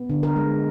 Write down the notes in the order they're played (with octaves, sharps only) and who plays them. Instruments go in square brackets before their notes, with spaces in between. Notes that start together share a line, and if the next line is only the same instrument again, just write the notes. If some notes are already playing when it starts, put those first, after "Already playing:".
Already playing: [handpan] B3
D3
A#4
G#3